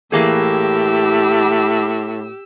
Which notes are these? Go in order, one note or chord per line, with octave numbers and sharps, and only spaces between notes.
A2 E3 A#3 G4 G#4 E6